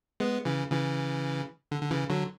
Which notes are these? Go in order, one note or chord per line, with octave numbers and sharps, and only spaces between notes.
G#3 B3
C#3 E3
C#3 E3
D3
D3
C#3 E3
D3 F#3